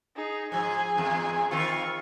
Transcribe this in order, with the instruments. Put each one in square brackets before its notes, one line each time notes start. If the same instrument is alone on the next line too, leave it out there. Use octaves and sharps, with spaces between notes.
[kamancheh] D#4 G#4
[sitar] G#2 F3 [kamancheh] G#4 G#5
[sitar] E2 G#2
[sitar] D#3 C4 F4 [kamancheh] C#6